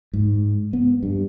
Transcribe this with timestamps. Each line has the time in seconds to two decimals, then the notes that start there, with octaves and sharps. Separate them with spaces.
0.13 G#2
0.73 B3
1.03 G2